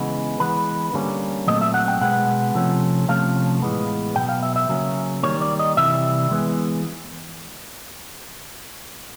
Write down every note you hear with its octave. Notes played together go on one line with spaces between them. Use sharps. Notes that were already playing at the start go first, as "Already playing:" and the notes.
Already playing: C#3 E3 G#3 B3
E3 G#3 B3 B4
D3 G3 A#3 C#4
A#2 F#3 A3 C4 D#5
E5
F#5
G5
B2 G#3 B3 F#5
C3 F3 A3 C#4
C3 F3 A3 C#4 F5
A2 E3 G#3 B3
B2 F#3 B3 G5
F5
E5
E5
C#3 F#3 A#3 C#4
D#3 G3 A#3 C#5
D5
D#5
C3 E3 G3 E5
E3 G#3 B3